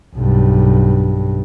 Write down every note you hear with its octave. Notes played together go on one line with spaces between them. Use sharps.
B1 G2